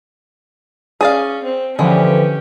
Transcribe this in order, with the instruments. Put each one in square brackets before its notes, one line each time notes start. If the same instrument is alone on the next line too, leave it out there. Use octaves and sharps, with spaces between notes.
[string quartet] C#4 [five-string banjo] G#4 D5 F5
[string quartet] C4
[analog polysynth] D3 E3 F3 [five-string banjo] G#3 [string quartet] C#4 G4